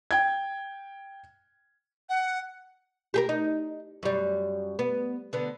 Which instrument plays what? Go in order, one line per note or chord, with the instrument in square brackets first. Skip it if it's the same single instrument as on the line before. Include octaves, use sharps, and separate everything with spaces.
[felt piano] G5 G#6
[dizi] F#5
[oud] G4 G#4 A#4
D#4
F#2 G3
B3
D3 B3